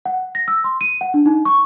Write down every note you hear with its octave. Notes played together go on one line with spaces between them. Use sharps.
F#5
A#6
E6
C6
D#7
F#5
D4
D#4
C#6